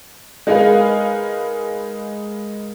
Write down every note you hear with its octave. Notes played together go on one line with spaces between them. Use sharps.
G#3 D#4 G#4 A#4 B4 F5